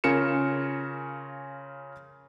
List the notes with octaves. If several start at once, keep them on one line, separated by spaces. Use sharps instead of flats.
C#3 C#4 F4 A#4 C#7 E7